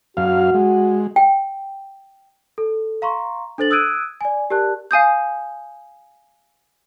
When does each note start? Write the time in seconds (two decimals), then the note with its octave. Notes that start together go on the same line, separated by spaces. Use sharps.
0.17 F#2 F#4 F5
0.54 G#3
1.16 G5
2.58 A4
3.02 F5 A#5 C6 C#6
3.58 D4 A4 C5 A6 F#7
3.70 D#6 E6 F#6 G#6 D7 D#7
4.21 D5 G#5
4.50 G4 A#4 D5 A5 F#6
4.91 F5 G#5 D#6 G6